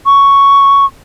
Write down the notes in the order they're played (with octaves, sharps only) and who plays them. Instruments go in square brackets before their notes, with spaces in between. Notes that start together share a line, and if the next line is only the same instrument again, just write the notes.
[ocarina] C#6